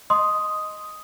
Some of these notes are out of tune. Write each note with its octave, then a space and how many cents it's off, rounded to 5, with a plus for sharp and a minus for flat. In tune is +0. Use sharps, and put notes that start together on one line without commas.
D#5 +0 C6 +0 D#6 +0